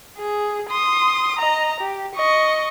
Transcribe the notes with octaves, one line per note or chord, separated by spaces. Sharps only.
G#4
C6 D#6
D#5 A#5
G4
D#5 C#6